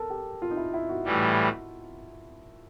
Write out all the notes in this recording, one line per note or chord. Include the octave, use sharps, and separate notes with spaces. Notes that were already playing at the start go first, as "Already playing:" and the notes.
Already playing: A4 A#4
G4
F4
D#4
E4
E4
F#4
A2 E3 G3